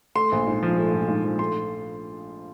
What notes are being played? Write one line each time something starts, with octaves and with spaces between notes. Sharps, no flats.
A3 C6
A#1
G#2
F3
A3
A#1
G#2
F3
A3 C6